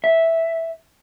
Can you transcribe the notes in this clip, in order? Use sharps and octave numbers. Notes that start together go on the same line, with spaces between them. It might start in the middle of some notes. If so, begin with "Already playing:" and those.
E5